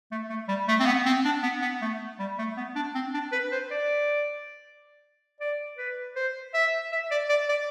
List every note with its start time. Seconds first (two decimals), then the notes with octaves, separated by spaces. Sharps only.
0.12 A3
0.30 A3
0.48 G3
0.68 A3
0.80 C4
0.86 B3
1.06 C4
1.25 D4
1.43 B3
1.62 B3
1.82 A3
2.19 G3
2.39 A3
2.57 B3
2.76 D4
2.95 C4
3.14 D4
3.32 B4
3.52 C5
3.71 D5
5.41 D5
5.78 B4
6.16 C5
6.54 E5
6.92 E5
7.11 D5
7.29 D5
7.49 D5